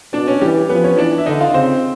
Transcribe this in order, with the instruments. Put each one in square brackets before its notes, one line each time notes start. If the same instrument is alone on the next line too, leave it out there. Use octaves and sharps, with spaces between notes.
[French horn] B2 [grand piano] D4 D5
[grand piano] C#4 C#5
[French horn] E3 [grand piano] G3 G4
[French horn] F3 [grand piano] B3 B4
[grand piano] C#4 C#5
[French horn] E3 [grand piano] D4 D5
[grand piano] E5
[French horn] D3 [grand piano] D#4 D#5
[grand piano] F4 F5
[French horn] C#3 [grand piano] C4 C5